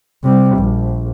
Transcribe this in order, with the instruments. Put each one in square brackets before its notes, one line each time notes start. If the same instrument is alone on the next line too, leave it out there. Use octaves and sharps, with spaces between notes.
[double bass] C3 G3
A#1